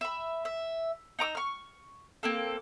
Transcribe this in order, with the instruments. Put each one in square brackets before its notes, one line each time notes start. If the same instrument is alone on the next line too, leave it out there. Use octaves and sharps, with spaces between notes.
[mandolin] E5 B5
E5
D#4 A#5 D6 E6
C#6 F6
A#3 C4 A4